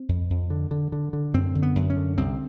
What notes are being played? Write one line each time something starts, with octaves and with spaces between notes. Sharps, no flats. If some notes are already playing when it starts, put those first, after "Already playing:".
Already playing: C4
F2
F2
D3
D3
D3
D3
F#2 C4
D3
B3
F#2
C#4
D3
C2 C4